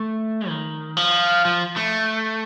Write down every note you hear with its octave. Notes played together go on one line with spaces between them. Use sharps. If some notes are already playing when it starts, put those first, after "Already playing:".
Already playing: A3
D#3
F3
F3
A3